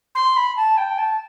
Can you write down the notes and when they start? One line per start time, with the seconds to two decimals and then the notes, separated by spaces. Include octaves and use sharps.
0.15 C6
0.37 B5
0.57 A5
0.77 G5
0.98 A5